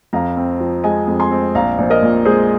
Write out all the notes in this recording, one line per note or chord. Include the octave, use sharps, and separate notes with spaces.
F2 F5 A#5
C4
F3
G#3 D#5 G#5
F2
G#5 C6
C4
A#1 F5 A#5
A#1 C5
A#4 D#5
A#2
G#3 G#4 C5